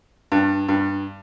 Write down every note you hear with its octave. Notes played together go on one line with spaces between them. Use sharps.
G2
G2